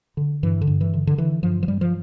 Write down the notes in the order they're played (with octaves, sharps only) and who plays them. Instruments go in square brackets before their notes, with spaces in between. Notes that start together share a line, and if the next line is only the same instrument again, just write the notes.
[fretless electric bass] D3
G2 E3
D3
G2
E3
D3
D3
D3 E3
G2 F3
F3
G2 G3
F3